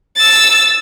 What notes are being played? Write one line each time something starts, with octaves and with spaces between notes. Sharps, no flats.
E6 A6